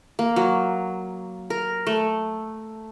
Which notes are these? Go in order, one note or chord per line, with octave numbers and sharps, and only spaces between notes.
A#3
F#3
A#4
A3